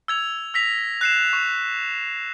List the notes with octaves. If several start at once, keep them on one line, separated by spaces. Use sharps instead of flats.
E6 G#6 F7
E6 A#6 B6 F7
F#6 C7 E7
C#6